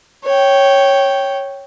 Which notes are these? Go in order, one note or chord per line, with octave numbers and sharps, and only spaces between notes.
C#5 G5